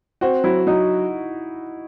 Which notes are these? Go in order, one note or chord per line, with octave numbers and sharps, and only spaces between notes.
C4 F#4
F#3 E4
F#3 D#4